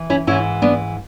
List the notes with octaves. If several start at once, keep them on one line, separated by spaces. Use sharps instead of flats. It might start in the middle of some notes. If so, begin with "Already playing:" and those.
Already playing: E3
C#4 E4
G#2 E3 C#4 E4
B3 D4